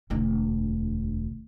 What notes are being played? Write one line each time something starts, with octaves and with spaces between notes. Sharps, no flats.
E1 D2